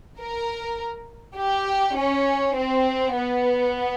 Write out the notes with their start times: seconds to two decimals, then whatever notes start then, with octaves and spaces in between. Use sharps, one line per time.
0.18 A#4
1.37 G4
1.96 C#4
2.56 C4
3.16 B3